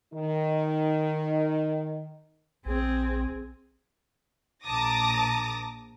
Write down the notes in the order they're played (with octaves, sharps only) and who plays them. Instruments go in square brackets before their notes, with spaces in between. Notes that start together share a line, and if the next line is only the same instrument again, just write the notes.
[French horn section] D#3 D#4
[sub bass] A#1 [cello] C4 G#4
[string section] A#1 A5 A#5 D6 D#6 A#6